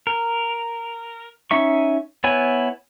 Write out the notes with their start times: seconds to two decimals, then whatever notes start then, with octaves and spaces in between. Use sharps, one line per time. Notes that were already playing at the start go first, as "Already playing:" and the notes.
0.07 A#4
1.51 C#4 D#4 E5 C#6
2.24 B3 E4 C#5 G#5